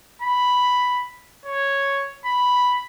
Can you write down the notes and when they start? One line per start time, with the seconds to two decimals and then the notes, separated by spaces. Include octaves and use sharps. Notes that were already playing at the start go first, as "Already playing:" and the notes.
0.22 B5
1.45 C#5
2.25 B5